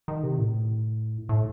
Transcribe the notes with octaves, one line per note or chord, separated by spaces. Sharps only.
D#3
C3
A2
A2